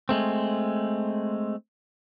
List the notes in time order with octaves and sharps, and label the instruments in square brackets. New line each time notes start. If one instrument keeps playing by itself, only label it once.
[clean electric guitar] G#3 A3 C4